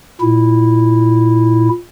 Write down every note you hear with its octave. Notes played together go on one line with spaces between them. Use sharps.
A#2 E4